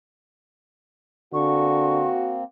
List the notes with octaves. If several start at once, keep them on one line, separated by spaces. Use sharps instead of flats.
D3 A#3 C4 F#4 C#6